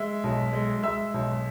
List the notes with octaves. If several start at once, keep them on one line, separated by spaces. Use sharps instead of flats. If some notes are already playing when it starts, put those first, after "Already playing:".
Already playing: G#3 E5 E6
B1
G#3
G#3 E5 E6
B1